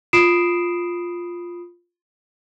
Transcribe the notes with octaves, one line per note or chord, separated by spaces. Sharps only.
F4 B5 D#6 C7 D7 E7